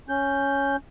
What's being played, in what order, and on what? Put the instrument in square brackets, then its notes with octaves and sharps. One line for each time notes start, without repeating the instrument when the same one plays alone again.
[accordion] C#4 G6